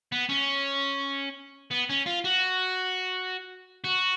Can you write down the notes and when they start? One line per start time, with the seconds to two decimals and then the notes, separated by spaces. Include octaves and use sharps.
0.12 B3
0.29 C#4
1.71 B3
1.90 C#4
2.06 F4
2.24 F#4
3.84 F#4